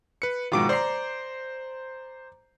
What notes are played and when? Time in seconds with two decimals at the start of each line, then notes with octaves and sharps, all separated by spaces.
0.22 B4 C#7
0.52 G#2 B2 D#3 F4 D6 D7
0.69 C5 D5 A#5 C7